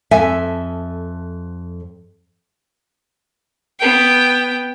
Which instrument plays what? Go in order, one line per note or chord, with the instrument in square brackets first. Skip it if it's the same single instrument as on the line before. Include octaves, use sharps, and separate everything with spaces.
[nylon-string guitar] F2 A4 E5 G#5
[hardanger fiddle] B3 G5